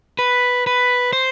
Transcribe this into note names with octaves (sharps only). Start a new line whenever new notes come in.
B4
B4
C5